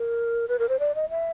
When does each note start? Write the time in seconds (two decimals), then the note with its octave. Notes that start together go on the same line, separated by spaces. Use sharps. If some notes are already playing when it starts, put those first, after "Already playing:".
Already playing: A#4
0.48 B4
0.59 A#4
0.69 C5
0.79 D5
0.95 D#5
1.10 E5